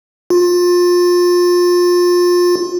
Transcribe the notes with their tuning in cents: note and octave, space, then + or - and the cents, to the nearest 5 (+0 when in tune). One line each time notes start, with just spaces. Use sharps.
F4 +25